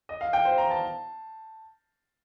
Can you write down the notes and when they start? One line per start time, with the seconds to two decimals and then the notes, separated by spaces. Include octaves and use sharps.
0.09 D#5
0.21 F5
0.33 G5
0.45 C5
0.58 A#5
0.71 A5